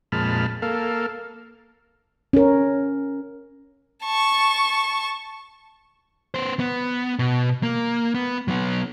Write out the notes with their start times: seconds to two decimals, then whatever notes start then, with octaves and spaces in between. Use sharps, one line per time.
0.12 F2 A#2 G#3 A5 B5 F6
0.62 A#3 A4 F5
2.33 C#4 A#4
4.04 A5 C#6
6.34 B3 C5
6.60 B3
7.19 B2
7.63 A#3
8.14 B3
8.48 F#3 B3